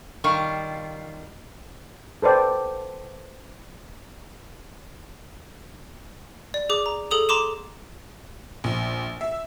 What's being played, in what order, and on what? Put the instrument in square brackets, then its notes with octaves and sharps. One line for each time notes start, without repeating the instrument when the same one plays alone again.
[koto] D#3 G3 F4 [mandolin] C#6 F6
[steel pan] A4 B4 C5 D5 G5
[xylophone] D5
G#4 D6
A#5
G#4 A4 D#6 F7
A#5 C6 D6 E7
[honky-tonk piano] A#1
E5